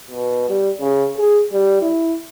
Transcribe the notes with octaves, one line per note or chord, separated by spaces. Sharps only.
B2
G3
C#3
G#4
G3
E4